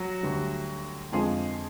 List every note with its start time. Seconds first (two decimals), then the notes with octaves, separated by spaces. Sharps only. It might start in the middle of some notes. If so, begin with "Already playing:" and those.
Already playing: F#3 F#4
0.23 D2 D3 G3
1.12 F2 D3 F3 G#3 G#4